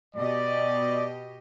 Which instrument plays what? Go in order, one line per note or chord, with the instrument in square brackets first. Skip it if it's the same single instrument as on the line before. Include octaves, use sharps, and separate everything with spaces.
[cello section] B2 G4 D#5 [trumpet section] D5